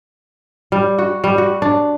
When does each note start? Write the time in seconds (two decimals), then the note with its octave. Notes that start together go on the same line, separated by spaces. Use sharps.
0.72 G3
0.98 F#4
1.24 G3
1.38 F#4
1.62 D4